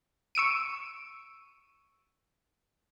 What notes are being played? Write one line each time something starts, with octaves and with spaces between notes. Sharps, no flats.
C#6 E6 D7 D#7